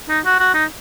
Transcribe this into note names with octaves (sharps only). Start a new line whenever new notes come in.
D#4
F#4
F#4
D#4